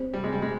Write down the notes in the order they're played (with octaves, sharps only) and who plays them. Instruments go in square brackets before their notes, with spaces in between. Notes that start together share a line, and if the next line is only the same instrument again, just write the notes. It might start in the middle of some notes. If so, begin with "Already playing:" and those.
Already playing: [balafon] C4 G4 C5
[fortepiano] G3
G#3
G3
G#3